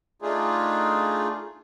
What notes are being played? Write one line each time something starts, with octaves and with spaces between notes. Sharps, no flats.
A3 D4 D#4 F4 G#4